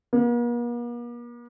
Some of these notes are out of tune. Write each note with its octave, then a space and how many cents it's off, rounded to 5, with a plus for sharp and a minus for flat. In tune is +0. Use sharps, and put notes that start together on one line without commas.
A#3 +45